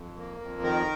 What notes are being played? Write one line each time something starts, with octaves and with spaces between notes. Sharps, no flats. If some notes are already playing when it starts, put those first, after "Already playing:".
Already playing: F2
A#3
F2
D#3 A#4